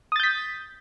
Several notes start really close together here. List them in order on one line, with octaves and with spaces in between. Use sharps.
D#6 A6 G6 B6